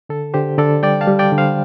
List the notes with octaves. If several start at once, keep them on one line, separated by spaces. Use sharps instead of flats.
D3 A4
D3 G4 C5
D3 A4 D5
G3 D5 G5
F5 A5
G3
D5 G5
D3
C5 F5